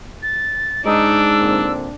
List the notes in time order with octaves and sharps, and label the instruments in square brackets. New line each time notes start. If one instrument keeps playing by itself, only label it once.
[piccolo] A6
[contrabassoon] G#2 [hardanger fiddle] D4 [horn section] D#4 [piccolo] E6
[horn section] A#2 D3 C4